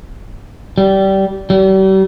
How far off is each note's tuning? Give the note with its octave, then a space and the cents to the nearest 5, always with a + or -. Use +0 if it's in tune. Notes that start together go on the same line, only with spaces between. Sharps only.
G3 -20
G3 -40